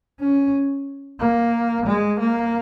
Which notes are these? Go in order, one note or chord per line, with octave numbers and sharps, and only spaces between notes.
C#4
A#3
G#3
A#3